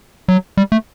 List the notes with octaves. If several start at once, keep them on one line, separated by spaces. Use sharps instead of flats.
F#3
G3
A3